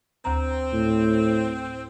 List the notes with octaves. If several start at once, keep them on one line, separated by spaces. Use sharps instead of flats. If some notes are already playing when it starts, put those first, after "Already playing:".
D2 C4 A#5
A2